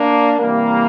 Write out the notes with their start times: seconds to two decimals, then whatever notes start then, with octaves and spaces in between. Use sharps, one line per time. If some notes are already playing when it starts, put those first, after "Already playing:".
Already playing: A#3 D4
0.40 C3 E3 G3 A#3